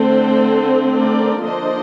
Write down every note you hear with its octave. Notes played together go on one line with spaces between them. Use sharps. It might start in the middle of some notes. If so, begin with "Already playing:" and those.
Already playing: D3 A3 C4 A4 C5
A#4 D5
D3 F3 A#3 D4 C5 D#5